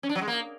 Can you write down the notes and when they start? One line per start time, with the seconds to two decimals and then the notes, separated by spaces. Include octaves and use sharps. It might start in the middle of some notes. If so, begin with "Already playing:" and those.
0.03 C#4
0.09 D4
0.15 F#3
0.21 G#3
0.28 A#3